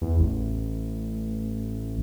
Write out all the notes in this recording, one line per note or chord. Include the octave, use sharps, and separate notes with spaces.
E2
A1